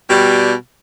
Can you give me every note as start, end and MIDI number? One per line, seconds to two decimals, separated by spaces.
0.10 0.53 47
0.10 0.53 55